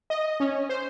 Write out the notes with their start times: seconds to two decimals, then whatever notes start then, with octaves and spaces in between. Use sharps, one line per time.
0.10 D#5
0.40 C#4
0.69 C5